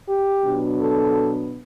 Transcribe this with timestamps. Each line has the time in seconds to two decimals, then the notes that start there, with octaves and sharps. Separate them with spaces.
0.09 G4
0.44 B2 F#3 B3 D4
0.80 A4